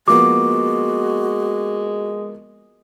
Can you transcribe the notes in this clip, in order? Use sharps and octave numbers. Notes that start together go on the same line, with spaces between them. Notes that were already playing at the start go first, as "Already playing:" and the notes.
F3 G#3 A#3 B3 F#4 D6